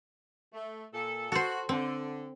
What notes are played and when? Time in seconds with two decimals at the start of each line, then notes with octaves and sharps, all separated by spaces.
0.53 A3
0.93 A#2 A4
1.32 F#4 A4 C5
1.69 D3 C4